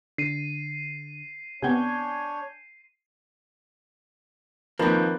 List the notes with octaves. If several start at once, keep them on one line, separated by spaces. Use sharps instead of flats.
D3 C7 D#7
C3 B3 C4 D4 C#5 G#5 G6 G#6
D#3 F3 A#3 C4 B4